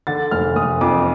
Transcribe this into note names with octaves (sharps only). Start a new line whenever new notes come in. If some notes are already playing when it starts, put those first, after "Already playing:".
D3 A6
F1 F6
F1 D#6
F2 D6